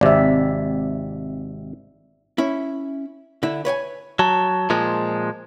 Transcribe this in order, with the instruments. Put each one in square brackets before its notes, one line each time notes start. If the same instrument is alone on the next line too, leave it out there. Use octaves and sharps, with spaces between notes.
[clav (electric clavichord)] G#1 C3 [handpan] D5 E5
[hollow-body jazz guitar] C#4 E4
D3 E4
B4 C#5 G5 G#5
[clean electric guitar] F#3 [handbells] A5
[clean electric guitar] A#2 F3 G#3